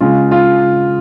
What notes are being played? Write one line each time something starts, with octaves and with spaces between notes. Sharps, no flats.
C#3 G#3 F4
F4